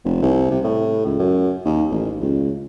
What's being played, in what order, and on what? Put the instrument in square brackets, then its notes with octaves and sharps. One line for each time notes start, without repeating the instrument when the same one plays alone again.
[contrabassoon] F1
C2
C3
A2
C#2
F#2
D#2
A1
C#2